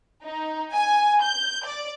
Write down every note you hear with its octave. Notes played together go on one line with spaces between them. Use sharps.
D#4
G#5
G6
D5